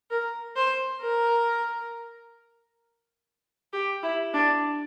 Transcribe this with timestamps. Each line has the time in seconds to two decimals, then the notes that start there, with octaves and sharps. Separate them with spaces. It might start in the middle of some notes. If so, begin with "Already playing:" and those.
0.11 A#4
0.56 C5
1.01 A#4
3.73 G4
4.03 E4
4.34 D4